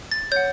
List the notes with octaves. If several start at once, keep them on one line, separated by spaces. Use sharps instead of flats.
A6
C#5 F#5 G6